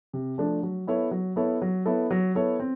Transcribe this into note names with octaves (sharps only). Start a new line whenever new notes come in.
C3
F3 A3 D4
F#3
B3 E4 A4 C#5
F#3
B3 E4 A4 C#5
F#3
B3 E4 A4 C#5
F#3
B3 E4 A4 C#5
C4